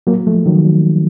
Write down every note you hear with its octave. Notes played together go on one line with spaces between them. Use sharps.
F#3 A#3
F3 A3
D#3 F#3